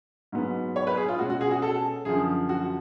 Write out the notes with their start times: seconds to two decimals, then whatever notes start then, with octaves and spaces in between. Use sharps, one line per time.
0.32 G#2 F#3 B3
0.76 C#5
0.87 B4
0.97 G#4
1.08 F4
1.19 B2 G#3 C#4 F#4
1.30 F#4
1.41 G#4
1.51 F#4
1.62 A4
2.05 F#2 D3 F3 G#4
2.49 F#4